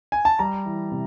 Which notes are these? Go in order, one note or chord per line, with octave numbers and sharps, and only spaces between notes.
G#5
A5
G3 A#5
E3
C3